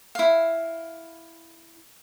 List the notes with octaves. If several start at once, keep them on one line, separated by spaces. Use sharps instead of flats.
E4 F5